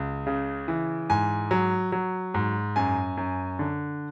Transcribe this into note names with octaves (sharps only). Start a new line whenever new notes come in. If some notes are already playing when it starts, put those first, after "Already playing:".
Already playing: C#2
C#3
E3
G#2 G#5
F#3
F#3
G#2
F#2 G#5
F#2
D3